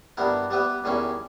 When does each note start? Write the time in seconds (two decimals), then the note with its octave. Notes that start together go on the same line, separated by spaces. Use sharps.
0.17 G2 G3 B3 E4 A#4
0.50 G3 B3 G4 B4 E5
0.84 E2 D#3 G3 C#4 E4